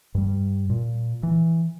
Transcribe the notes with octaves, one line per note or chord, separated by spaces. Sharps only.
G2 G3
A#2
E3